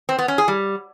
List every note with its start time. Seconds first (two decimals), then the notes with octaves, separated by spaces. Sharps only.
0.09 C4
0.18 B3
0.28 C#4
0.38 G#4
0.48 G3